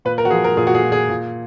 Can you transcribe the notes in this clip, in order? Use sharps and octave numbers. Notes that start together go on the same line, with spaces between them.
A#2 B4
A#4
F#4
F3 G#4
A#4
A#2 G#4
F#4
G#4
A#2
G#4
A#2